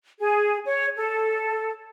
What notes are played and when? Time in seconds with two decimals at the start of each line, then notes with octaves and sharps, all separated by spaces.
0.19 G#4
0.65 C#5
0.97 A4